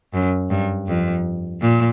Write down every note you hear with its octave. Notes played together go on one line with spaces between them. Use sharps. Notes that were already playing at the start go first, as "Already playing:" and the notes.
F#2
G2
F2
A#2